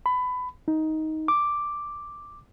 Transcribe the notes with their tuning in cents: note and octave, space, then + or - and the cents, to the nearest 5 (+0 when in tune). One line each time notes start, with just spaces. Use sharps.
B5 +20
D#4 +10
D6 +0